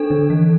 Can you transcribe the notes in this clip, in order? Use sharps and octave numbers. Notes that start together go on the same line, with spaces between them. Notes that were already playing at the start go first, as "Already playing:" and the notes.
Already playing: D4 A4
D3
E3